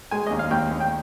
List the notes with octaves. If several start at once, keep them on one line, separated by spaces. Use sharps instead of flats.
G#3 G#5
D#2 D#5
F5
D#2 G5
D#2
G5